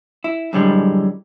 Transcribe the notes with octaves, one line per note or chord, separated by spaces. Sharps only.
E4
F#2 A2 D3 G3 G#3